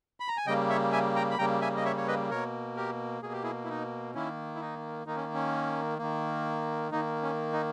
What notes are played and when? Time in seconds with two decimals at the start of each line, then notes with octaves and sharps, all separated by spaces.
0.20 B5
0.28 A#5
0.37 G#5
0.46 C#3 G3 A#3 D#5 G5
0.70 C#5 E5
0.92 E5 G#5
1.16 G5 A#5
1.31 B5
1.38 C#3 G3 A#3 G5 A#5
1.62 E5 G#5
1.77 D#5
1.85 C#5 E5
1.97 C#5
2.08 B4 D#5
2.30 B2 A#3 A#4 C#5
2.77 G4 A#4
3.23 B2 A#3 G#4
3.33 G4
3.43 E4 G#4
3.64 E4
3.69 D#4
4.14 D#3 A#3 C#4 E4
4.55 E4
4.61 D#4
5.06 D#3 A#3 D#4
5.16 C#4
5.35 C#4
5.99 D#3 A#3
6.91 D#3 A#3 D#4
7.22 C#4
7.53 D#4